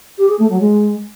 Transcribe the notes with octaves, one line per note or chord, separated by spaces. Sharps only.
G4
G#4
A3
F#3
G#3